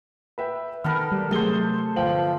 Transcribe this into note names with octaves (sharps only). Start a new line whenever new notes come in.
B4 E5 G5
D#3 B3 A4 A#4 G5 B5 F6
G3
C3 F#3 A3 G#4 A4 C5 G7
G1 F3 G5 F#7